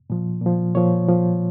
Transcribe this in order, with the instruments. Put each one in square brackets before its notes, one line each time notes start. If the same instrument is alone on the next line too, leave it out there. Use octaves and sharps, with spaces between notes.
[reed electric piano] A#2 F3
A#2 F3
A#2 F3 C#5
A#2 F3